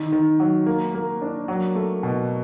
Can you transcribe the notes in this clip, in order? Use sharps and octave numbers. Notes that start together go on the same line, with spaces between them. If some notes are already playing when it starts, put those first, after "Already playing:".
Already playing: D#3
D#3
F#3
A#3
A#3
D4
F#3
A3
B2